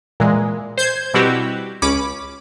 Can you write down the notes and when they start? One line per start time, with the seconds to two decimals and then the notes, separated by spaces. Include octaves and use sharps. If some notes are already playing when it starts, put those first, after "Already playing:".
0.20 A#2 E3 G#3
0.78 C5 G6 G#6
1.14 B2 G3 C4 E4 F#4 G4
1.82 C#2 C#4 B5 D6